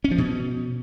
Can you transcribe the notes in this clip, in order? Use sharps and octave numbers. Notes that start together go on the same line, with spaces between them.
C#4
F3
B2